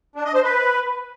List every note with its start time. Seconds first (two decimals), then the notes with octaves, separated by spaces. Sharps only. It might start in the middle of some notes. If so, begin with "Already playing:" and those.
0.16 D4
0.25 D#5
0.34 C5
0.44 B4